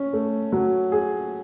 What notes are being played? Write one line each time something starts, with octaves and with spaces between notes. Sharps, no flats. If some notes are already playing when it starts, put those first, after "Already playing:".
Already playing: C#4
A3
F#3
G#4